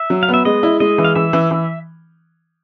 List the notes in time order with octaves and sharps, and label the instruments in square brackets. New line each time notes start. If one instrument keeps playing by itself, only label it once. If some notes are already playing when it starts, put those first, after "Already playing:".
Already playing: [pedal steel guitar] E5
[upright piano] F#3
[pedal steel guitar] F5
[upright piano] B3
[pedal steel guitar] E5
[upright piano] G#3 [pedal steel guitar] D#5
[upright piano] E4
[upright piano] G#3 [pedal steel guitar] D#5
[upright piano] E3
[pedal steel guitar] F5
[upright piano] E3 [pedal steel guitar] E5
[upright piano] E3
E3